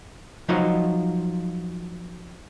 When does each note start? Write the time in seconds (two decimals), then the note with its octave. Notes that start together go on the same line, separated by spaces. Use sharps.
0.49 F3 F#3 D#4 F4 C#5 D#5